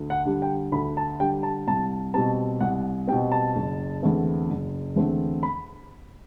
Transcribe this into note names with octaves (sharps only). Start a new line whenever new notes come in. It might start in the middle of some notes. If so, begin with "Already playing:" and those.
Already playing: D2
F#5
D3 G3
G5
D2 B5
A5
D3 G3 G5
A5
C2 A5
B2 G3 C4 A5
C2 F#5
B2 G3 C4 G5
A5
F#1
E2 D3 A3 C4
F#1
E2 D3 A3 C4
B5